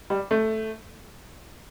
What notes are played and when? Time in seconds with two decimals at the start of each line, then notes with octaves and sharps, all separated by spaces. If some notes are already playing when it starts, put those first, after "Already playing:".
0.10 G3
0.31 A3